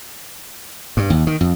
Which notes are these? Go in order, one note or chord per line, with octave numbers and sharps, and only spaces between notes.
G2
D#2
D#3
F2